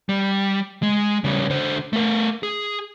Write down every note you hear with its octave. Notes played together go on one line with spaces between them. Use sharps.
G3
G#3
C#3 G3
D3 C5
A3 A#4
G#4